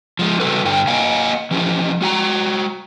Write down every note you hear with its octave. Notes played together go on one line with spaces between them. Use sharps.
F3 G#3
C#3 G3 C#4 F#4 A4 B4
G2 D3 G5
A#3 D#5 F5 F#5 G#5
E3 F3 C#4 G4
G#3 F#4 G5 A#5